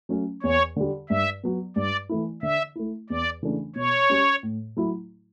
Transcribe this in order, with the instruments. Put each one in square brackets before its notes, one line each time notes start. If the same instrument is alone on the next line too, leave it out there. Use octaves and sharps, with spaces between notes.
[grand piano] F#3 A3 C#4
[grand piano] E2 [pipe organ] C#5
[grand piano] D3 G3
[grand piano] G2 [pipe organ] E5
[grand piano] F#3 B3
[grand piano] G2 [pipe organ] D5
[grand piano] E3 A3 E4
[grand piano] D3 [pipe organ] E5
[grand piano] A3 E4
[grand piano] E2 [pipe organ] D5
[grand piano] C#3 E3 A3 D4
[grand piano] B2 [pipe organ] C#5
[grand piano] G3 C#4
A2
F#3 A3 E4